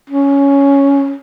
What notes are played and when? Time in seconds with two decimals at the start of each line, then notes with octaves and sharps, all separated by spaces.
0.10 C#4